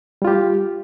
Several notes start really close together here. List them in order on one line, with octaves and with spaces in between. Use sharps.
G3 F4 G4